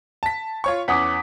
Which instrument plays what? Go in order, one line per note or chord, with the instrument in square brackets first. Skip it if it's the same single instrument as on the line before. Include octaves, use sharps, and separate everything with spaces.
[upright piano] A5 B6
F4 C#5 C#6
[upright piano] E2 C#4 F#5 [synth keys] D6 D#6 B6